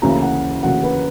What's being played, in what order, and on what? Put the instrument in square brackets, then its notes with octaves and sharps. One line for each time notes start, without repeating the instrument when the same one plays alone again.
[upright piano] D2 C#3 E3 A#3 [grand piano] A#5
[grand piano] F#5
[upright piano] D2 C#3 E3 A#3 [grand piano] F#5
[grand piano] B4